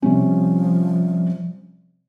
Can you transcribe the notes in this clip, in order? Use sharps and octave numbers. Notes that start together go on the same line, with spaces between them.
C3 F3 G3 C#4